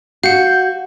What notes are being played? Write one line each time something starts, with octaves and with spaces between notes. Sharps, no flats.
F#4 F5 F#5 G6